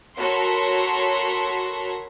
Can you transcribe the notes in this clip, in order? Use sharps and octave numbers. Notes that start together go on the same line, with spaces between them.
F#4 A4 A#4 C#5 B5 C6